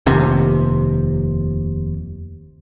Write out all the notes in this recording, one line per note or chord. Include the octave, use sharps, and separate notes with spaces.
F1 D#2 C3